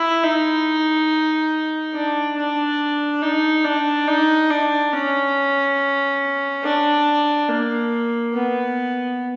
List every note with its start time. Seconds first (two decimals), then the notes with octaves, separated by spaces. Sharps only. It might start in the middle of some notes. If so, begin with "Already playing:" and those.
Already playing: E4
0.23 D#4
1.94 D4
2.36 D4
3.22 D#4
3.64 D4
4.08 D#4
4.50 D4
4.93 C#4
6.64 D4
7.49 A#3
8.33 B3